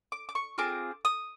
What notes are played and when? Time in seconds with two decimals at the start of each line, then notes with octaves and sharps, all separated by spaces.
0.12 D6
0.29 D6
0.35 C#6
0.58 C4 F4 G#4 D6
1.05 D#6